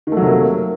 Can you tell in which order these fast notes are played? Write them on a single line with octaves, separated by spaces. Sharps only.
D#3 A3 F#3 C3 A#3